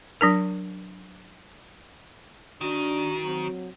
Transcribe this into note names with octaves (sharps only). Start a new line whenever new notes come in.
F#3 D4 A#4
D#3 D4 F#4
F#3 C4